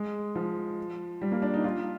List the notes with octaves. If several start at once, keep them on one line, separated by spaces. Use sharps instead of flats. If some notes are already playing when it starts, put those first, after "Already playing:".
Already playing: G#3
F3
G3
A#3
D4
D#4
F4